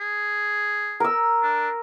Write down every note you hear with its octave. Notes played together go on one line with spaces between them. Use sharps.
G#4
A#4 E6
D4